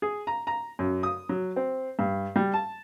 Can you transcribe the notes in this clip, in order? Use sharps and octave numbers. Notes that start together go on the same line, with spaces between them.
G#4
A#5
A#5
F#2
D#6
F#3
C4
G2
G3
A5